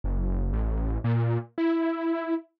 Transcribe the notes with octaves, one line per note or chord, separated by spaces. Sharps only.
F#1
A1
A#2
E4